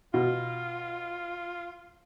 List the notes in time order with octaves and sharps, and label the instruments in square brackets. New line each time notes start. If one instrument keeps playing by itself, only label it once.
[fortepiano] B2 [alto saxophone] F4